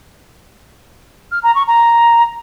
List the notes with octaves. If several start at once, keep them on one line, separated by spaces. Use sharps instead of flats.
F6
A#5
C#6
A#5